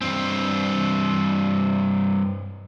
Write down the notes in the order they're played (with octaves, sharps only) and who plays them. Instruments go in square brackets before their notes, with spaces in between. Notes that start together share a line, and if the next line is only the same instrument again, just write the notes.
[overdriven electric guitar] G2 C4